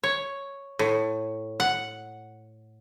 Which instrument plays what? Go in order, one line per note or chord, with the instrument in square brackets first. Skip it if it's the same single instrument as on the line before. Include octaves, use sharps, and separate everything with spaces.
[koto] C#5
A2
F#5